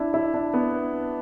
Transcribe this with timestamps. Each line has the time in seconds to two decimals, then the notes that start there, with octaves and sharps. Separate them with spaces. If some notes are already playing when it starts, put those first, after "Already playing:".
Already playing: D4 E4
0.14 E4
0.34 D4
0.54 B3